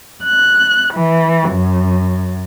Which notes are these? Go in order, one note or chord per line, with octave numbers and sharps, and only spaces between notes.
F#6
E3
F#2